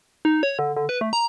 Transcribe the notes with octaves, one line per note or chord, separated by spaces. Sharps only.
D#4
C#5
D3
D3
B4
A3
A#5